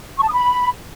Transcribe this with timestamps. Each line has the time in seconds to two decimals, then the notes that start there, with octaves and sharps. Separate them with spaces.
0.18 C#6
0.23 A5
0.28 D#6
0.33 B5